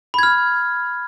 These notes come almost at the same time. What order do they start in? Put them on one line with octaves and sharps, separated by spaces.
B5 G#6 F6